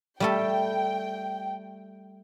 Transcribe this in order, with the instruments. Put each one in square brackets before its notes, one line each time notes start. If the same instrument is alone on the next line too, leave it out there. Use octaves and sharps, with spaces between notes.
[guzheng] G3 A3 A4 [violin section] G5